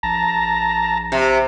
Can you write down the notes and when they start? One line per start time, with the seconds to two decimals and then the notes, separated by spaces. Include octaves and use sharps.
0.03 A#1 A5 A#5
1.12 C3